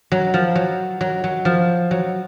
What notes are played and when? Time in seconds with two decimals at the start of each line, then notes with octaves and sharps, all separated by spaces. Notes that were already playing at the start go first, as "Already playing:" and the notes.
0.12 F#3
0.34 F3
0.55 F#3
1.01 F#3
1.24 F#3
1.45 F3
1.91 F#3